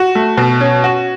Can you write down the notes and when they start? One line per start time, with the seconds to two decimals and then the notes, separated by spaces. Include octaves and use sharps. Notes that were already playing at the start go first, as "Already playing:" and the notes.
Already playing: F#4
0.15 A3
0.38 B2
0.61 C#4
0.84 F#4